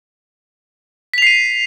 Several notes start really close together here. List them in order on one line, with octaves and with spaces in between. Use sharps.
B6 F7 C7 D#7